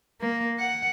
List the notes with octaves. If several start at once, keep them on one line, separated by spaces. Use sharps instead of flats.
A#3
F#5